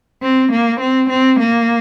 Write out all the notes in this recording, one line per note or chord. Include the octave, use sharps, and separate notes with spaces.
C4
A#3
C4
C4
A#3